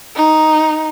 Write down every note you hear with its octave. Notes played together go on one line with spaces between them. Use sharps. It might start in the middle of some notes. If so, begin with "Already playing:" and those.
D#4